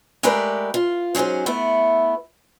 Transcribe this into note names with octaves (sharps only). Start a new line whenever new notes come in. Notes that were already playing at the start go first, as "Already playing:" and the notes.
G#3 A3 G4 A#4 B4 D5
F4
G#2 F#3 C#4 G#4 C5
A3 B3 E4